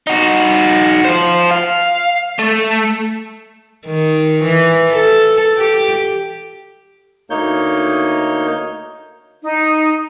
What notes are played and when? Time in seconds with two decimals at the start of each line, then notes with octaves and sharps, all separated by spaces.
0.07 D#4 F#4
1.05 F4 C5
1.51 F5
2.39 A3
3.87 D#3
4.44 E3
4.91 A4
5.58 G4
7.30 D2 A#3 D#4 C#5 G6
9.43 D#4